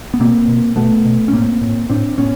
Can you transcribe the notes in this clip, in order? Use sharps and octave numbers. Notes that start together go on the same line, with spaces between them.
B3
B2 A#3 C4
B2
B2 A3 B3
B2
C#4
A2 A#3 C4
A2
A2 C4 D4
A2 B3 C#4